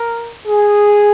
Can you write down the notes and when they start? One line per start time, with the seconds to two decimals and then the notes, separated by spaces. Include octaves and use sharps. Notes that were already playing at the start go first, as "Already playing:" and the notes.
Already playing: A#4
0.46 G#4